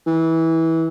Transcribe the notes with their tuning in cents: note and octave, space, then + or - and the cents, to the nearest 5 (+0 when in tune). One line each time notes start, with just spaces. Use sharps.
E3 -20